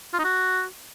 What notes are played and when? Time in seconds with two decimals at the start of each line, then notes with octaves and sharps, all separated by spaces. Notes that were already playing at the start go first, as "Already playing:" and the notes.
0.14 F4
0.19 D#4
0.24 F#4